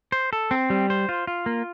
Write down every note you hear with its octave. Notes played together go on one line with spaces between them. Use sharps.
C5
A4
C4
G3
C5
F4
F4
A#3